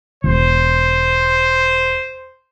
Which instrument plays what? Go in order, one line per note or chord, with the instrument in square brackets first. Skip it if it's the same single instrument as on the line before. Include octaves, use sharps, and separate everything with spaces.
[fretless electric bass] E1 [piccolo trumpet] C5